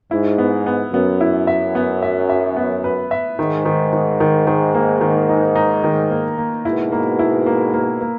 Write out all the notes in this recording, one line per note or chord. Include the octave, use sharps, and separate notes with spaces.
G#2 E4
B3
B3
F#2 B3
E4
E5
B3
E5
E5
B3
B4
E5
G#2 D#3
D#3
D#3
D#3
D#3
A#3
D#3
D#4
D#4
D#3
A#3
A#3
G#2 B2 E4
A#3
E4
A#3
A#3
A#3